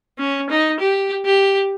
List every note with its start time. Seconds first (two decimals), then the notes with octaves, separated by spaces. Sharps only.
0.19 C#4
0.49 D#4
0.79 G4
1.25 G4